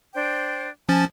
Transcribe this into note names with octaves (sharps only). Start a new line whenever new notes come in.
D4 C5 G5
F3 C#4 G#5 A5 A6